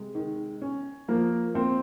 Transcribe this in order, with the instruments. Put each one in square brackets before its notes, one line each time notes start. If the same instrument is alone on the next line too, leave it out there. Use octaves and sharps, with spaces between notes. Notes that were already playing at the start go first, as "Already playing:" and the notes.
Already playing: [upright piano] C3 [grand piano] G#3
[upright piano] D#3
C#4
[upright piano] F3 [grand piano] A#3
[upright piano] A#3 [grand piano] C4